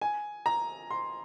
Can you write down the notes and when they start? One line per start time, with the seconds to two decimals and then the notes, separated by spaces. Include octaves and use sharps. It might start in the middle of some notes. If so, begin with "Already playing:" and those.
0.01 G#5
0.46 A#5
0.91 C6